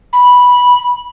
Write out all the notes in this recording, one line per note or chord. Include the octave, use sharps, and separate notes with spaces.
B5